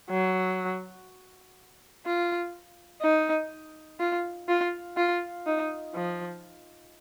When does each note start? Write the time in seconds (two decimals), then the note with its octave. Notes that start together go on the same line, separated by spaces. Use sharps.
0.11 F#3
2.06 F4
3.02 D#4
4.00 F4
4.49 F4
4.97 F4
5.46 D#4
5.95 F3